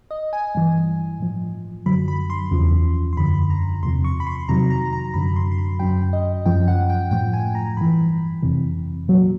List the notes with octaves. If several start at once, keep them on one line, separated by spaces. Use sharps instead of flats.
D#5
G#5
G2 E3
A2 F3
F#2 D3 F#3 B5
B5
C6
E2 C#3 F3
C6
F#2 D3 F3 B5
A#5
E2 C3 F3 C6
C#6
B5
C6
F2 C3 D#3 F#3 A#5
A#5
A#5
F#2 D3 F#3 B5
C6
C6
B5
F#2 C#3 F#3 G5
D#5
F#2 C#3 F3 G5
F#5
G5
A2 F3 G5
G#5
A#5
G2 E3 B5
F2 C3 E3
A#2 F#3